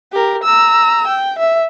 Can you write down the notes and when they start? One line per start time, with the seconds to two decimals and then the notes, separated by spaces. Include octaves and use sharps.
0.12 G4 A#4
0.44 A#5 E6
1.08 G5
1.39 E5